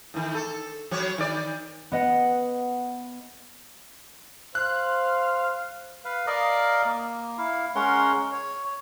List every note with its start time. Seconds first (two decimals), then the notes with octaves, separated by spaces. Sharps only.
0.14 A2 D#3
0.35 A4
0.91 F#3 C#5
1.18 D#3 D5
1.92 B3 D#5 F#5
4.55 C5 F5 F#6
6.05 B4 F5
6.27 A#4 D5 D#5 F5
6.85 A#3
7.38 E4 F5
7.75 G#3 C#4 A#4 C#5 F#5 C6
8.32 C#5